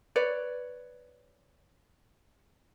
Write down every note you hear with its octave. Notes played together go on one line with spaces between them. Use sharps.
B4 C#5 D5